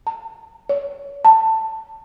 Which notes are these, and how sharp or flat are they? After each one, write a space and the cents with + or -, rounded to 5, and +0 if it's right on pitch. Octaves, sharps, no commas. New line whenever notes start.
A5 +45
C#5 +30
A5 +15